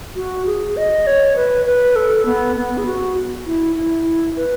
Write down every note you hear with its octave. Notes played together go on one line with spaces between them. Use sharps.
F#4
G#4
D#5
C#5
B4
B4
A4
B3
B3
G#4
F#4
E4
E4
B4